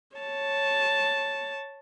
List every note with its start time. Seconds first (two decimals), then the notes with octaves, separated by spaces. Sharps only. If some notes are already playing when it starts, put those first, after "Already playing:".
0.16 C#5 A5